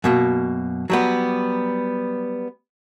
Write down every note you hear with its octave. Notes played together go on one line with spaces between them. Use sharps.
F#2 B2 A#3
F#3 G3 B3